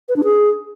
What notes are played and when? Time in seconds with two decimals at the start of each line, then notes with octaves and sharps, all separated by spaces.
0.09 B4
0.16 D4
0.24 G#4